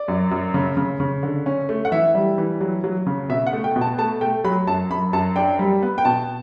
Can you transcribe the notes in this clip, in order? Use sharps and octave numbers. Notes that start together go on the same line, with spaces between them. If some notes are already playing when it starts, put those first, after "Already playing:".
Already playing: D5
F#2
F#2
C#3
C#3
C#3
D3
C#4
A3
F#5
E3 E5
G3
E3
F#3
F#3
C#3
B2 E5
F#5
A3
G5
B2
A5
A3 A5
A3 G5
F#3 B5
F#2 A5
F#2 B5
F#2 A5
D4 G5
G3
B3
G5
B2 A5